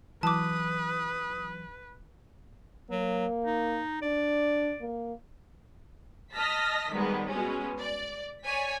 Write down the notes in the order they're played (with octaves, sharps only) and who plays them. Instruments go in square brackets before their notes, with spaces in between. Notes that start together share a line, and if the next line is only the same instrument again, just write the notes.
[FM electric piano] E3 F#3 [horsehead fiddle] B4 [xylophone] A5 D6 [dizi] D#6
[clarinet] F#3 [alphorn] A#3
[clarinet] D#4
[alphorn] D4 [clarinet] D5
[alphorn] A#3
[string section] D#5 A5 F6 A#6 B6
D#3 G3 G#3 B3
B2 G#3 C#4
D5
C#5 D5 G#5 B6